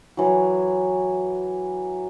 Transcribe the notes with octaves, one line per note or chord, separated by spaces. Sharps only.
E3 F#3